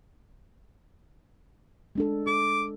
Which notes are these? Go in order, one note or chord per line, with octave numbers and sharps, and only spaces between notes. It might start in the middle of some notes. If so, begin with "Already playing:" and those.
G#3 D4 A4
A4 D6